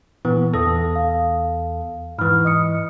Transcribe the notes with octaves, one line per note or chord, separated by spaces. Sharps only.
A#2 E3 B3
E2 A4 D#6 A#6
F5
G#2 E3 B5 F6
D#5 D#6 C#7